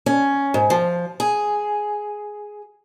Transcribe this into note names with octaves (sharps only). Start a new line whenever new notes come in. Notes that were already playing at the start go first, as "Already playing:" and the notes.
C#4
G#2
F3
G#4